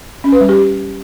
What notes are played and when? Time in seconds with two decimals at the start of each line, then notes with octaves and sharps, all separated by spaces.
0.24 C#4
0.32 B4
0.41 G3
0.49 G4